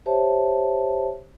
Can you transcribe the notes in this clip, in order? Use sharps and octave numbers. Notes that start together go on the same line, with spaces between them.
G4 C5 C#5 E5 A5